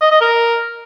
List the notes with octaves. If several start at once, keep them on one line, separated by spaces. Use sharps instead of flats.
D#5
D#5
A#4